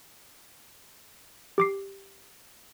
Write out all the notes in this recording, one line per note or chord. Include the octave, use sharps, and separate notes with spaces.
G4 D6 C7